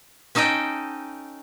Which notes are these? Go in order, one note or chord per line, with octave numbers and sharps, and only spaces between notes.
C#4 D#4 A4 D#5 G5